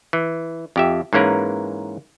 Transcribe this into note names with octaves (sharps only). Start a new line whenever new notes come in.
E3
F2 G4 E5
G#2 E3 A#3 C#4 A#4 B4